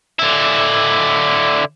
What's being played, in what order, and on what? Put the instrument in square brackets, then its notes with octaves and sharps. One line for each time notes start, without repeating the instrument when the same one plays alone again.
[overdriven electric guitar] D3 E4